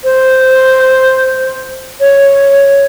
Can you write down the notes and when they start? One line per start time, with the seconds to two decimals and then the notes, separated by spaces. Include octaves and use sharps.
0.04 C5
2.00 C#5